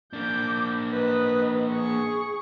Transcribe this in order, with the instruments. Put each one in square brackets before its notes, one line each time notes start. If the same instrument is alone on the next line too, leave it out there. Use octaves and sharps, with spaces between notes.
[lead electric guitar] A#3 D4 [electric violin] D6 G6
[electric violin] B4 D#5
G#4 C#6